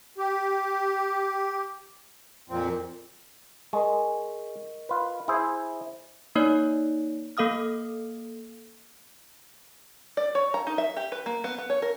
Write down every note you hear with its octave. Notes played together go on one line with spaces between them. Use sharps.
G4
F2 A#2 C4
G#3 A#4 D#5 C#6
F4 B4
E4 G#4 C5
A#3 D#4 C#5 D5
A#3 A4 F5 D#6 F6
D5
C#5
A#5
D#4
E5
G4
B4
A#3
B3
B3
C#5
A#4